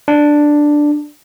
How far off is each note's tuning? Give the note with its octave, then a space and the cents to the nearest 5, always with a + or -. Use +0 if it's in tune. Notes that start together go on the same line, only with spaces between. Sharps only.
D4 +5